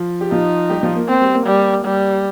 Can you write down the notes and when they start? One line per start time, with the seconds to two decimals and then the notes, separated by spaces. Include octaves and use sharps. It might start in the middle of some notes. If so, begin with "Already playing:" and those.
Already playing: F3 F4
0.21 G4
0.31 F3 D#4 F4
0.70 G3 G4
0.83 F3 F4
0.95 A#3
1.09 A#3 C4
1.21 G3
1.34 A#3
1.47 G3
1.85 G3